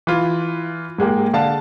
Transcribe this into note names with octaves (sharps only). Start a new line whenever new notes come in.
E3 F4
G#2 G#3 A#3 G4
D3 F5 A5